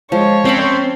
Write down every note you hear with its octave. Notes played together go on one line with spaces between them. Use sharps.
F3 G#3 C#5
C4 C#4 G5 A5 B5